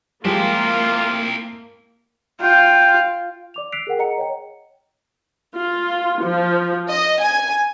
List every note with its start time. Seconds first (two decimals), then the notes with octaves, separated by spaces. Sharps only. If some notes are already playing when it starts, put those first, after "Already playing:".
0.25 F3 G#3 A#3 C4 E4 F4 G4
2.42 F4 G5
3.54 D5 D6 F7
3.72 E6 F#6 B6 C7 D7 F7
3.87 G#4 A#4 F#5 G5
3.99 G#4 D#5 F#5 A#5 C#7
4.18 C#5 D#5 G5
5.57 F4
6.23 F3
6.89 D#5
7.21 G#5